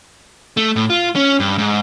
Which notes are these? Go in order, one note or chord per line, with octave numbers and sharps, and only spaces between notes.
A3
A2
F4
C#4
G2
G#2